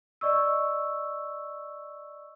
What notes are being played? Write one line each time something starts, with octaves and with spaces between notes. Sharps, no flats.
D5 D#5 C#6 E6